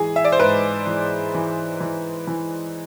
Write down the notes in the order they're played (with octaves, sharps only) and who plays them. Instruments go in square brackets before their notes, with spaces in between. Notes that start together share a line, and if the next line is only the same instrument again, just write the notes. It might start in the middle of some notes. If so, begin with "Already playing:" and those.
Already playing: [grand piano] G#2 E3 G#4
E5
D5
C5
G#2 B4
E3
E3
E3
E3